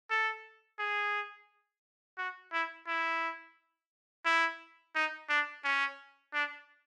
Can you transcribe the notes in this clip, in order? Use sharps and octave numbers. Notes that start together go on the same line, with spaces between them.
A4
G#4
F#4
E4
E4
E4
D#4
D4
C#4
D4